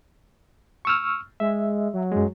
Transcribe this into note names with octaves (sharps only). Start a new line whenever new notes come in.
C#6 E6 F6
G#3 E5
F#3
F#2 G#3